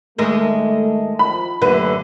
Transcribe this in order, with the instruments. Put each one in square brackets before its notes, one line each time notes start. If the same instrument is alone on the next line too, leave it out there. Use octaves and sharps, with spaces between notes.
[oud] D#2 G#3 A#4 [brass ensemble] A3
[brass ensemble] D#3 F3 [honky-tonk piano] B5
[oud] F#2 D3 [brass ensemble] A3 A#3 G4 [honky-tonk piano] B4